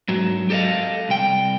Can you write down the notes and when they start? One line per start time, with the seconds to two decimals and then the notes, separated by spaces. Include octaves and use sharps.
0.08 G#2 F#3
0.50 G4 A4 C#5 D#5 F5
1.09 C2 G5